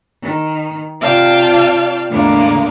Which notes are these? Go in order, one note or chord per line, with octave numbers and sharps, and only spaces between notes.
D#3
C3 F4 D5 F5 G5 A5
E2 A2 D3 G#3 A#3 D6